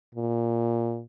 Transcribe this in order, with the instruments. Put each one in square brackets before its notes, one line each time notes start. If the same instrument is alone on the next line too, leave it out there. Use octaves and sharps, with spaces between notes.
[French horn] A#2